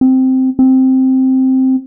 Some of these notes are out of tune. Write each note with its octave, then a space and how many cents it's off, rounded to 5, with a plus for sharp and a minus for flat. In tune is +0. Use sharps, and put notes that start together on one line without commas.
C4 -5
C4 +0